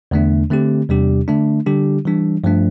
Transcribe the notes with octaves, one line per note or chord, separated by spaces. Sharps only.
E2 D3 A3 D4
D3 A3 C4 G4
E2 C3 G3 D4 G4
D3 A3 D4
D3 G3 D4 G4
E3 G3 D4
G2 F3 A3 D4